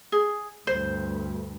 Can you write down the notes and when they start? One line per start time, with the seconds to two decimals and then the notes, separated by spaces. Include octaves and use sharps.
0.12 G#4
0.67 D2 G2 C5